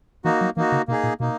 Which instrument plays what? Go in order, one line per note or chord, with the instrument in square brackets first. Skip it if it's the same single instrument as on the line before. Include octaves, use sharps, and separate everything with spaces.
[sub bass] E3 [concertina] A#3 D#4 F#4
[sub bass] F#3
[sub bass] E3 [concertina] A#3 D#4 F#4
[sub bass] C#3
[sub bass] B2 [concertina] A#3 D#4 G#4
[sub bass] A#2
[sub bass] B2 [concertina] A#3 D#4